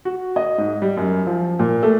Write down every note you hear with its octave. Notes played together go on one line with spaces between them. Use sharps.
F#4
D#5
G#2
G3
F#2
F3
A#2
A3